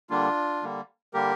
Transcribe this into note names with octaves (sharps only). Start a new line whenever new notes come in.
D3 G3 A#3 D4 F4
D3 G3 A#3
D3 G3 A#3 G4 A#4